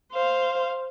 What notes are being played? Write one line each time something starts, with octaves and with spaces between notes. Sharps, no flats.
C5 F5